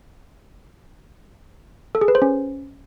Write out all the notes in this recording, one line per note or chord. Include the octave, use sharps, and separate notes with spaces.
A4
G#4
B4
C5
C#4